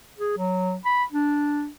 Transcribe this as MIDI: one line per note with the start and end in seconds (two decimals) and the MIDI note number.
0.19 0.34 68
0.38 0.75 54
0.85 1.04 83
1.11 1.68 62